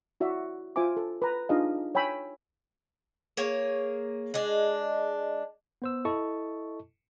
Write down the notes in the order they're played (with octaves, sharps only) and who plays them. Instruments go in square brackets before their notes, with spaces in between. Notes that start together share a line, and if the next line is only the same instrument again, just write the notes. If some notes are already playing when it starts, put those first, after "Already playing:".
[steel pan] E4 F#4 D5 E5
F4 C5 E5 G#5 D6
A4
B4 A#5
D4 D#4 F4 G#4 D#5 F5
C#5 G5 G#5 B5 E6
[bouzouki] A#3 G#4 C#5
G#3 D4
[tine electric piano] B3 C5 E6
E4 A4 D#5 A5 C#6